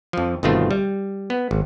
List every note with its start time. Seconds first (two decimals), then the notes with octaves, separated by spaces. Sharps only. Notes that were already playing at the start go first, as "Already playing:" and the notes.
0.13 F2 F3
0.43 G1 B2 D#3 A3 C4 F4
0.71 G3
1.30 B3
1.51 G#1